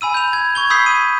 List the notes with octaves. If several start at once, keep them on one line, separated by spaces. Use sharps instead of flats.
G#5 B5 E6 D#7
G6 F7
G#6
C#6 G#6 G7
B5 D#6 E6 G6 B6 C7
D#7